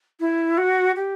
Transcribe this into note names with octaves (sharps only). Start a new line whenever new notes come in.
E4
F#4
G4